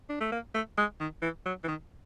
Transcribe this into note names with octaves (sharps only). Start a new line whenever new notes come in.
D4
A3
A#3
A3
G#3
D#3
E3
F#3
E3
D#3